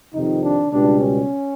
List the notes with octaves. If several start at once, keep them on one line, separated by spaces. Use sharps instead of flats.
F2 C3 D#3 D#4
D4
C#2 B2 G3 D4
C#4